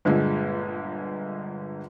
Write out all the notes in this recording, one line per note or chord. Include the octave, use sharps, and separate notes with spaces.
G1 A#2 D3 G#3